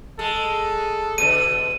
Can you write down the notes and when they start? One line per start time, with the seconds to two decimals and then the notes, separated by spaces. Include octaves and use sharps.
0.19 G#3 A4
1.18 B2 D3 D#7